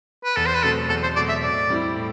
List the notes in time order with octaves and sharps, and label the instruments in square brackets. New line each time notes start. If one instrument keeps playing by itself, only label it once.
[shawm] B4
[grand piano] E2 [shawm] A4
[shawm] C5
B4
[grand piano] B2 F#3 A3 C4 [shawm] A4
[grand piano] E2 [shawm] A4
[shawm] C5
[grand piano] B2 F#3 A3 C4 [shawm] D5
[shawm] E5
[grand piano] A2 [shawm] D5
[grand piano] G3 C4 E4 G4
A2